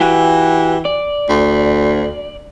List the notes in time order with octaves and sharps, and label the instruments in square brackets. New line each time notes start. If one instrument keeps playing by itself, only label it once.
[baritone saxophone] E3 [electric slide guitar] F#4 G4
[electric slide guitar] D5
[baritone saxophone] D2